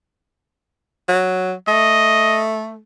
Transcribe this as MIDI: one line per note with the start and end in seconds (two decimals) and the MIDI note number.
1.08 1.53 54
1.68 2.80 57
1.68 2.43 75